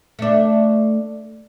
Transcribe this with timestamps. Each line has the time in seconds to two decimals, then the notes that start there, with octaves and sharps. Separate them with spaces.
0.19 A3 D4